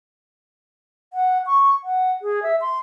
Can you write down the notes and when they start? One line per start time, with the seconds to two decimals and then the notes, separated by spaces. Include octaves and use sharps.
1.13 F#5
1.46 C#6
1.84 F#5
2.22 G#4
2.43 E5
2.61 C6